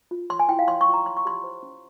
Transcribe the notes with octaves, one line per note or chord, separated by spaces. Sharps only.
F4
C#5 C6
G#5
E4 G5
F5
C#5 C6
C#6
F4
A#5
C#5 C6
C#6
G4 C6
C5
C#4